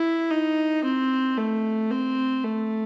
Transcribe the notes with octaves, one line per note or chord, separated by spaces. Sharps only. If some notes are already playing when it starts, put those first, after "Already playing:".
Already playing: E4
D#4
C4
A3
C4
A3